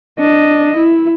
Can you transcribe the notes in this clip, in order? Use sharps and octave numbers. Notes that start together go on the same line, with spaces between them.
D4 D#5
E4